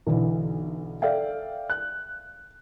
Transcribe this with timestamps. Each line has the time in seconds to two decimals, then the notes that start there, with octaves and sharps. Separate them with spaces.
0.07 B1 D3 E3
1.02 A4 D5 E5 F5 G5
1.70 F#6